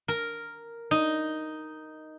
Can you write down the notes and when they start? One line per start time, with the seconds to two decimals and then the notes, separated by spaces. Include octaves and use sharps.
0.08 A#4
0.91 D#4